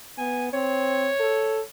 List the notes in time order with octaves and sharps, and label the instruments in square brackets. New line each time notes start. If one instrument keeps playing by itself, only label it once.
[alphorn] B3 [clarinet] G#5
[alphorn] C4 [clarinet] C#5
[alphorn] A4